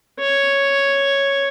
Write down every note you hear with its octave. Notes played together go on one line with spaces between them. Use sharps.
C#5